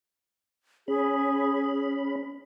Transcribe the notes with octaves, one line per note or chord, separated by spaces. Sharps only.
C#4 G#4 B5